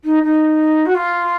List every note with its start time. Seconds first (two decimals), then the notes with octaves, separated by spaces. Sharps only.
0.04 D#4
0.23 D#4
0.86 F#4
0.95 F4